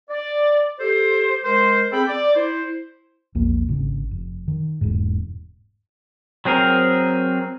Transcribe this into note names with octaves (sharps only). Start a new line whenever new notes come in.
D5
G4 A4 C5
G#3 A#4 C5
C4 G#4 A4 G5 B5
D5
E4 C5
A#1 E2 A#3
G#1 C#3
F1
D#3
E1 G#2
F#3 C4 G#4 A#4